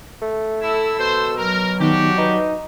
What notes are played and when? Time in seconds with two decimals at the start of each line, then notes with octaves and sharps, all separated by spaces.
0.22 A3
0.61 E4 A4 E6
0.99 B2 C5
1.38 F#3 A#4
1.80 D#3 B3 D4 D#4 F#4 G4
2.18 D#4 B4